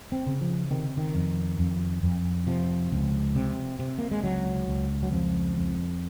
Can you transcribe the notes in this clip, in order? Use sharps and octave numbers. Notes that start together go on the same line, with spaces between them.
C4
C#3
F3
C3 D#3
D#3
F2
F2
F2
C3 F3
C#2
C3
C3
A#3
G#3
C#2 F#3
C#2
F#3
F2 F3
F2